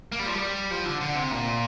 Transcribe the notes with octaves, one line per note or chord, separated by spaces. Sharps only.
A#3
G3
F3
G3
F3
D3
D3
C3
A#2